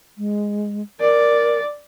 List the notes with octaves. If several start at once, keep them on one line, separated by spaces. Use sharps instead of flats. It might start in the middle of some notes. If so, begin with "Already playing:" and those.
G#3
A#4 D5